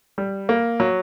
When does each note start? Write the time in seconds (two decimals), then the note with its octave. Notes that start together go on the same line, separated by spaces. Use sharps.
0.18 G3
0.49 A#3
0.80 F#3